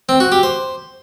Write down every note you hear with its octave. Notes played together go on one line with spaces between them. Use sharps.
C4
F#4
G4
C5